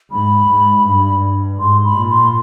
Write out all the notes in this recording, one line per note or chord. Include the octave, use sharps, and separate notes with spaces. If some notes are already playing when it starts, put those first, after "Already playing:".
G#2 B5
G#2
G2
G#2 C6
B5
A#2
C6